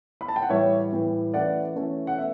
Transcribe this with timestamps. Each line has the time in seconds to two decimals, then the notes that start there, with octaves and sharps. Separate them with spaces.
0.21 B5
0.28 A5
0.36 G5
0.43 F#5
0.50 A2 E3 G3 C#5 E5
0.93 A2 E3 G3
1.34 E3 A3 C#4 D5 F#5
1.76 E3 A3 C#4
2.07 F#5
2.18 B3 E5